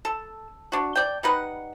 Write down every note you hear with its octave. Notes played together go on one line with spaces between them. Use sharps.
A4
D4 F#4
D5 G5
G3 D#4 B4 F#5